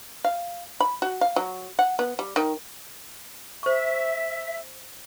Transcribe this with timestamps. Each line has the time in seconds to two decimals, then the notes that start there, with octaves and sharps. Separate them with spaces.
0.25 F5
0.80 B5
1.02 F#4
1.21 F5
1.36 F#3
1.79 F#5
1.99 B3
2.19 G3
2.36 D#3
3.63 C5 E5 C#6